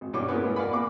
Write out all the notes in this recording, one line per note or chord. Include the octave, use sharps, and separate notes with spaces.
G#1
G2 B2 C#4 D4 C#6 D6
B3 E4 F4 G#4 A#4
G#3
A#4 D5 F5 F#5 G#5 B5
E2 A#2 C#6 D6